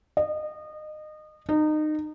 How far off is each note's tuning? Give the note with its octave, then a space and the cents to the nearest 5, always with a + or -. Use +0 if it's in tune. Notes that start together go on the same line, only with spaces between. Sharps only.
D#5 -25
D#4 -25